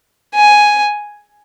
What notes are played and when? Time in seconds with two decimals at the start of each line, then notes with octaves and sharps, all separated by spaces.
0.35 G#5